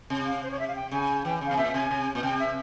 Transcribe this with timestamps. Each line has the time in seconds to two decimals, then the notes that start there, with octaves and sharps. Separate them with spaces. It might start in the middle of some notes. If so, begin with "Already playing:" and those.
0.10 C3
0.26 F5
0.43 C5
0.51 C#5
0.59 E5
0.68 F5
0.76 G5
0.91 C#3 G#5
1.19 G#5
1.25 E3 G5
1.41 C#3
1.46 F5
1.51 C3
1.57 A#2 E5
1.74 C3 G#5
1.91 C3
2.15 A#2
2.23 C3 G5
2.39 E5